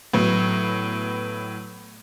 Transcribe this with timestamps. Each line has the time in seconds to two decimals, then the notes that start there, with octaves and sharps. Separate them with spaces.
0.13 A2 F#3 B3